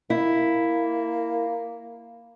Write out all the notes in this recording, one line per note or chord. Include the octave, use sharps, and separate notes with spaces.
A#3 E4